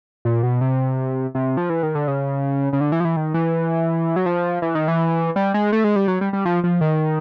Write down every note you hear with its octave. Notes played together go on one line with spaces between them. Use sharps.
A#2
B2
C3
C3
F3
E3
D#3
D3
C#3
C#3
D3
E3
F3
E3
D#3
E3
F#3
F3
E3
D#3
E3
G3
G#3
A3
G#3
G3
F#3
G3
G3
F3
F3
D#3